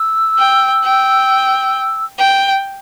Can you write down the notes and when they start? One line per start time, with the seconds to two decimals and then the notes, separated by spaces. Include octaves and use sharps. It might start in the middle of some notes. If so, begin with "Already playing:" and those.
Already playing: E6
0.38 G5
0.84 G5
2.18 G5